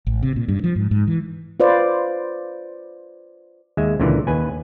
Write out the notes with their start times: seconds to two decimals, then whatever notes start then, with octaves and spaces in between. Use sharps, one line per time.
0.07 A1
0.23 C3
0.36 A#2
0.48 G2
0.64 F3
0.76 G#2
0.91 G#2
1.07 E3
1.60 F4 B4 C5 D5
3.77 D#2 G#3 E5
4.00 C#2 A#2 D3 E3
4.27 D#2 B4 G#5